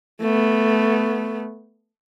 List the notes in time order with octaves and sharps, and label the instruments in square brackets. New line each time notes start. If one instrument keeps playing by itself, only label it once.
[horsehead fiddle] A3 B3